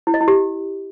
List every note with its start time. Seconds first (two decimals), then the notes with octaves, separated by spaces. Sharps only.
0.07 E4
0.14 D#5
0.21 E4
0.28 G4